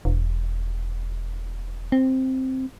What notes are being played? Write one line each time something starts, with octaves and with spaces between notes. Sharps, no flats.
E1
C4